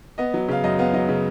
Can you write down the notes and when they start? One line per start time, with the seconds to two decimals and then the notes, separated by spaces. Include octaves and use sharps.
0.18 B3 D#5
0.34 F#3
0.48 C#3 F5
0.64 F#2 D#5
0.79 B3 F5
0.93 F#3 D#5
1.08 C#3